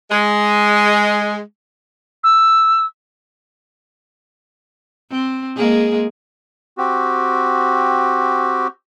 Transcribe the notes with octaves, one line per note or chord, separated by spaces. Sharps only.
G#3
E6
C4
G#3 A#3 G#4
C4 F#4 G4